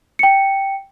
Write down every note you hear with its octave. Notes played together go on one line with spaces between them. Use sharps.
G5 C#7